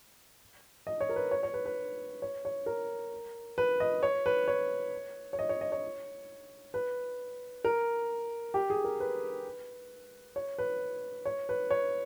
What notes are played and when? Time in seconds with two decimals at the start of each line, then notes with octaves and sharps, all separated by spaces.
0.87 D#5
1.01 C#5
1.09 A#4
1.16 B4
1.31 C#5
1.43 C#5
1.54 B4
1.66 B4
2.22 C#5
2.45 C#5
2.66 A#4
3.58 B4
3.80 D#5
4.03 C#5
4.26 B4
4.48 C#5
5.33 C#5
5.39 D#5
5.49 C#5
5.61 D#5
5.72 C#5
6.74 B4
7.65 A#4
8.54 G4
8.70 G#4
8.84 A#4
9.00 B4
10.36 C#5
10.58 B4
11.25 C#5
11.49 B4
11.71 C#5